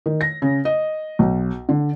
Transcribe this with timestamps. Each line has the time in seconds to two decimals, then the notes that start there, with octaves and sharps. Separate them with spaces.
0.06 D#3
0.21 A#6
0.42 C#3
0.65 D#5
1.19 B1
1.69 D3